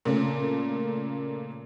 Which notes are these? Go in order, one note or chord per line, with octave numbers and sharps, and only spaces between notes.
A#2 C#3 A3